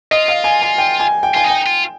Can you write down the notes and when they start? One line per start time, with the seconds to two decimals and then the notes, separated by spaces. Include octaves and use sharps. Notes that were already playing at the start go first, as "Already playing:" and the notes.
0.11 F4 D#5
0.28 F5
0.44 G#5
0.62 G#5
0.78 G5
1.00 G#5
1.23 G5
1.34 F4 G#5
1.44 D#4
1.50 G5
1.67 F4